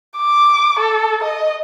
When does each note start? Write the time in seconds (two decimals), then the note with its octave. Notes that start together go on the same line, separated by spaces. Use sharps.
0.17 D6
0.79 A4
1.23 D#5